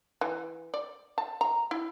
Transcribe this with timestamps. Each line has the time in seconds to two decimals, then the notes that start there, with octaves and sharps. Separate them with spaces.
0.21 E3
0.74 D5
1.18 A5
1.41 A#5
1.71 E4